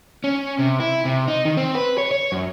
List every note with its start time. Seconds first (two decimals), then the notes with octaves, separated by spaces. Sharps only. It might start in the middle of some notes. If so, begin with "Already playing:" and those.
0.24 C#4
0.59 C3
0.80 E4
1.05 C3
1.28 D#4
1.45 D#3
1.57 C4
1.75 B4
1.98 C#5
2.11 C#5
2.32 F#2